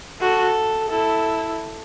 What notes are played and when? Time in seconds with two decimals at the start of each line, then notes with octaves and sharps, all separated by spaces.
0.21 F#4 A4
0.89 E4 A4